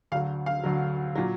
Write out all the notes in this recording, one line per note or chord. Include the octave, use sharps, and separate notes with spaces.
D2 D3 F#3 F5
F5
D2 D3 F#3
A#2 F#3